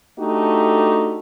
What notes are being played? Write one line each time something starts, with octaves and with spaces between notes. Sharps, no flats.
A3 D4 D#4 F#4 G4